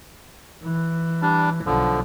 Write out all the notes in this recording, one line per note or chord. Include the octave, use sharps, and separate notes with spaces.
E3
G3 D4
B1 D3 F3